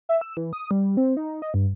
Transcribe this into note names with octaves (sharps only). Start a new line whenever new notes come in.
E5
E6
E3
D#6
G3
C4
D#4
D#5
G2